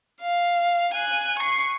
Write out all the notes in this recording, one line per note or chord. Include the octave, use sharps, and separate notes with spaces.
F5
G#5 F#6
C#6 C7